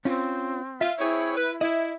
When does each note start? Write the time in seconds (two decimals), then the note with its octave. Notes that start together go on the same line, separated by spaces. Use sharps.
0.05 C4 C#4 F4
0.81 F4 E5
0.99 C4 E4 G#4 C#5
1.36 B4
1.61 E4 D#5